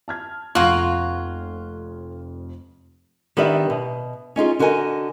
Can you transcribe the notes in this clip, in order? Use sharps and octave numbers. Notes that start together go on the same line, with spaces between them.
A5 F6 G#6
F1 F2 A#3 F4 F#4 G#6
D#3 B3 D4 G4 D5 E5
B2
C#4 D#4 F4 G#4
D3 F#4 A#4 D#5 G#5